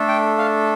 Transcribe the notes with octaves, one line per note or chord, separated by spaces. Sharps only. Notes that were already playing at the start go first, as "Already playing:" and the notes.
Already playing: A3 D4 A4
G5
F5